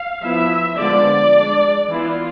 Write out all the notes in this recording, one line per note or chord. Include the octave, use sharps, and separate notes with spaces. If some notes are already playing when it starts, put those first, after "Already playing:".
Already playing: F5
F3 B3 E4 E5
D3 F3 G#3 B3 D5
G#3 D4
E3 B3 E4 F4